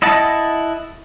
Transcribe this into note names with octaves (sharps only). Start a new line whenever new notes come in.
E4 D#5 F#5 A5